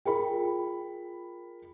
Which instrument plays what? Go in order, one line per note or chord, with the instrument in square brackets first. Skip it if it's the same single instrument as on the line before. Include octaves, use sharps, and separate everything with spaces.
[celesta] F4 G5 [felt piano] G#4 A#4 B5